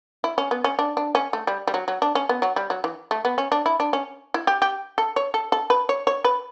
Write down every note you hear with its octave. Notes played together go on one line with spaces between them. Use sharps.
E4
C#4
B3
C#4
D4
D4
C#4
A3
G3
G3
F#3
F#3
D4
C#4
B3
F#3
G3
F#3
E3
A3
B3
C#4
D4
E4
D4
C#4
E4
G4
G4
A4
C#5
A4
A4
B4
C#5
C#5
B4